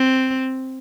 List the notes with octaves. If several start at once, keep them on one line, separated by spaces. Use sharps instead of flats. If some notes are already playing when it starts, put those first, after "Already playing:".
Already playing: C4